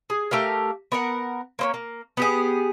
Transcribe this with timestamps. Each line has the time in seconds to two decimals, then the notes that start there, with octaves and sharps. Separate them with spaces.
0.10 G#4
0.31 A3 G4 A#4 F5
0.92 B3 A#4 F#5
1.59 A#3 C4 C#4
1.74 A#3
2.17 B3 G4 G#4